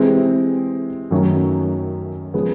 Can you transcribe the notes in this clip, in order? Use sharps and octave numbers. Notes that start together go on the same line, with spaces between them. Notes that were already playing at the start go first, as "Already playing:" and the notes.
Already playing: C3 E3 G#3 C4
F#2 D#3 F#3 A3 C#4
C#3 F3 G#3 B3